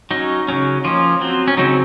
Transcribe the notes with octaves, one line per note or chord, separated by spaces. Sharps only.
F#3 C#4 D#4
C#3 F#3 C#4
F3 A#3 C#4 F4
F#3 C4
C#4
C#3 F#3 C4 D#4